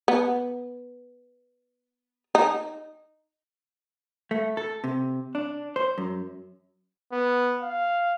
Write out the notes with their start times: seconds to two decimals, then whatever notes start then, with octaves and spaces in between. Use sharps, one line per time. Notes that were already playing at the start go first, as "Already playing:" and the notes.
0.08 B3
2.35 D#4
4.31 A3
4.57 A4
4.84 C3
5.35 D4
5.76 C5
5.98 F#2
7.12 B3
7.62 F5